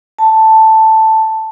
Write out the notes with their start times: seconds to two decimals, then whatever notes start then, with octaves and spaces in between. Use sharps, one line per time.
0.19 A5